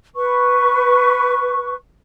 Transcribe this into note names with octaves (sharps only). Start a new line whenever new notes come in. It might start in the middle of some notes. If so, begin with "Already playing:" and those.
B4 C#6